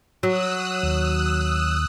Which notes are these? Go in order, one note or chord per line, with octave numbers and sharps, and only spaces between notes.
F#3 D#6 E6 F#6
D#2